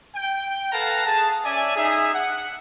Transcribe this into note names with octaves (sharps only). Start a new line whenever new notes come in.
G5
A4 B4 F5 F#5 A5 A#5
G#4 A5
C#4 D5 E5 G#5
D#4 G#4 E5
F#5